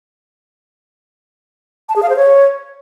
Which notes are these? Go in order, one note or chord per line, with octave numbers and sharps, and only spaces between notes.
A5
G#4
F5
C5
C#5